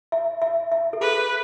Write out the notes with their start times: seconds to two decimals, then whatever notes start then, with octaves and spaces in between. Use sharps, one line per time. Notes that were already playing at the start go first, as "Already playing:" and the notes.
0.12 E5
0.42 E5
0.72 E5
0.93 A4
1.01 G#4 B4